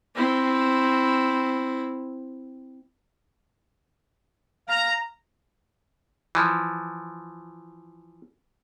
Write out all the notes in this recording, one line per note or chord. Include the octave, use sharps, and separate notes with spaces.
C4 E4
F5 A#5
E3 F3